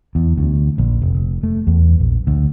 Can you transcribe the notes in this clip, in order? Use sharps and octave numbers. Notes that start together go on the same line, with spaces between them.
E2
D2
A#1
F1
A3
E2
A#1
D2